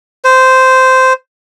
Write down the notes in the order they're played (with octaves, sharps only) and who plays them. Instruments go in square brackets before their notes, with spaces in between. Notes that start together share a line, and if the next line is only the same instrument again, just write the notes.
[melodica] C5